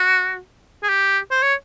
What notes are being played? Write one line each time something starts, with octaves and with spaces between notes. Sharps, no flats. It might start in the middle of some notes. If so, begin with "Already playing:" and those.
Already playing: F#4
G#4
G4
C5
C#5